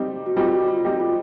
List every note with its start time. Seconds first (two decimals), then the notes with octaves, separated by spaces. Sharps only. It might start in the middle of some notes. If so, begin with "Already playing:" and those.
Already playing: G3 C4 D#4 G4
0.26 F#4
0.36 G3 C4 D#4 F4 G4
0.52 F#4
0.68 F4
0.84 G3 C4 D#4 G4
1.00 F4